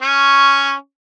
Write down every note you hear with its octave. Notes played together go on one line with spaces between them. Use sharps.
C#4 C#6